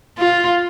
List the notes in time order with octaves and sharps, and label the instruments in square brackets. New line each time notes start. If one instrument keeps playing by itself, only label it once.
[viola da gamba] F4